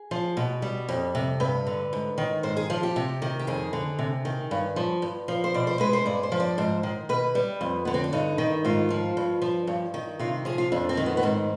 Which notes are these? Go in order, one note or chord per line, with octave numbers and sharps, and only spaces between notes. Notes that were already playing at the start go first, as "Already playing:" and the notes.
Already playing: G#4
F3
B2
G3
F2
C3
G2 B4
D3
G#2
D#3
G#2 C5
G#4
F3 F4
G4
C3
D#3
G4
F2 G#4
D3
C3
D#3
G2
F3
G2
F3
C5
B2 D5
C5
G#3 B4
C5
G2 D5
C5
F3
D5
G#2 C5
D#3
B2 B4
G3
F2
D3 B3
C4
D4
G2 D#4
D#3
G#2 F4
F3
G2
F3
G2
D#3
C3 F4
F3 G#4
F4
F2 D4
C4
D#3
B3
B3
G#2 C4